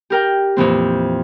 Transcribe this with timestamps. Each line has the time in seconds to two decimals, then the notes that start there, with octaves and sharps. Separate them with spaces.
0.10 G4 A#4 G5
0.57 F2 A#2 E3 C4